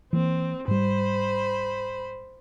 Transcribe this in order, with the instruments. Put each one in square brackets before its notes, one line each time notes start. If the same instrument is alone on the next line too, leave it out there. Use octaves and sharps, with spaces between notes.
[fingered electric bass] E3 A#3 [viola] C4
[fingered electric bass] G#2 G3 [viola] C5 B5